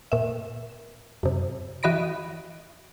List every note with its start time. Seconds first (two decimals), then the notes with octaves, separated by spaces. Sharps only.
0.12 A#2 E5
1.23 F#2 C3
1.83 E3 F#4 D#5 B5 A#6 D7